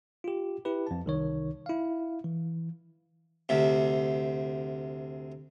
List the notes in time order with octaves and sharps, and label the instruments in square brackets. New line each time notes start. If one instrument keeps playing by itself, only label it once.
[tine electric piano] F4 G4
E4 G4 B4
F2 A5
C2 D#3 C#5
E4 F5
E3
[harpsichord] D2 C3